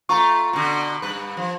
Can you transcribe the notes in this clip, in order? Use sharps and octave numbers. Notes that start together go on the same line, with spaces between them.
A3 F4 A#5 C#6
B2 D3
G2 B4
F3